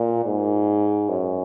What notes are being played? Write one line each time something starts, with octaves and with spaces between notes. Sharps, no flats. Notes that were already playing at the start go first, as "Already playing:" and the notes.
Already playing: A#2
G#2
F#2